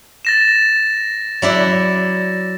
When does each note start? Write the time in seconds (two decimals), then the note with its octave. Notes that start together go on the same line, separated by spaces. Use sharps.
0.25 A6 A#6 E7
1.42 F#3 E4 D5